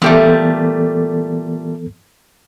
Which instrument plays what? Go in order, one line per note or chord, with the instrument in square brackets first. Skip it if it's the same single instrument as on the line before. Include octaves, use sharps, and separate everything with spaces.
[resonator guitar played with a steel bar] A#2 G3 A3 [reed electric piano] E3 B3 A4